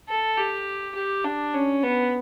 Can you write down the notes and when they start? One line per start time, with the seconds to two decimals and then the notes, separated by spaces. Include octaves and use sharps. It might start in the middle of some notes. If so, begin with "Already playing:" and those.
0.09 A4
0.38 G4
0.95 G4
1.25 D4
1.54 C#4
1.83 B3